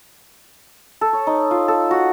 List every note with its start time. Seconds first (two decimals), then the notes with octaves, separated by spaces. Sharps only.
1.01 A4
1.13 C#5
1.27 D#4
1.51 F4
1.68 A4
1.91 F#4